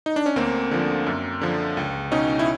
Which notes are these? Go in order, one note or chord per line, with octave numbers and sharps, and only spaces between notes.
D#4
D4
C#4
D2 A#3 C4
D3 F3
F#2
D3 F3
C#2
B2 C#4 D#4
E4